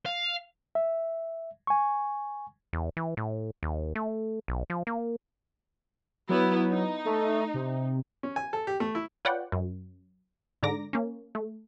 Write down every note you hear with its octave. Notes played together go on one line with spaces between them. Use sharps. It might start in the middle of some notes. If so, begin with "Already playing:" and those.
F5
E5
G#5 C#6
E2
E3
A2
D#2
A3
B1
F3
A#3
F#3 B3 E4
D#4
A3
C3
C#4
G#5
A4
G4
A3
E4
F4 B4 C#5 D5 F#5 G5
F#2
G#2 D3 D5 A#5 D6 A#6
A#3 C#4
A3